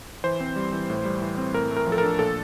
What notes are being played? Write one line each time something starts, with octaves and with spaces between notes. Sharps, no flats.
E3 C5
C4
G3
E3
A2
G3
E3
C4
A2 A#4
A3
A#4
F3
A4
A#4
D4
A#2 A4